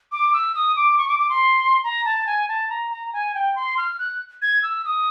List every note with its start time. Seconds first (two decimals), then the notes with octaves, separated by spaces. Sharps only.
0.12 D6
0.33 E6
0.55 D#6
0.76 D6
0.98 C#6
1.09 D6
1.19 D6
1.29 C6
1.84 A#5
2.05 A5
2.26 G#5
2.48 A5
2.70 A#5
2.91 A#5
3.13 G#5
3.35 G5
3.55 C6
3.77 F6
3.99 F#6
4.42 G#6
4.63 E6
4.85 D#6